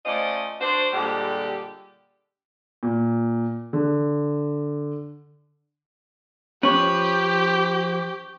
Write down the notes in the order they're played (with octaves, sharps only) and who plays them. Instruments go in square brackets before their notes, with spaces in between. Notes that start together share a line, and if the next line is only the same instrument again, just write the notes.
[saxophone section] A3 C#4 F4 C5 D5 D#5
D4 F#4 C5
A#2 D3 G3 G#3 G4
[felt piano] A#2
D3
[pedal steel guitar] F3 B4 [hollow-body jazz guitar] C#4 C#5 [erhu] G4 [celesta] C#6 F#7